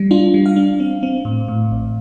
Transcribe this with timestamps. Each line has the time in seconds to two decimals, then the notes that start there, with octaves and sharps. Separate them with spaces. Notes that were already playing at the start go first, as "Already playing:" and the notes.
Already playing: G3
0.11 D4 F4
0.34 G3
0.46 F5
0.56 D4
0.80 C4
1.03 C4
1.25 A2
1.48 A2
1.72 A1